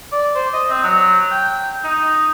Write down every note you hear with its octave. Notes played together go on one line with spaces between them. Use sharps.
D5
C5
D#5
C4
F#3
G5
D#4